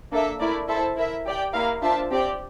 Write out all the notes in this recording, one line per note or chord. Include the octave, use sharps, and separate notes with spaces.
A#3 D4 A4 E5
A3 E4 A#4 D5
E4 A4 C5 E5 A5
E4 A#4 E5
G4 D5 G5
A#3 E4 A#4 F5
D4 F4 C5 E5 A5
C4 G4 D5 G5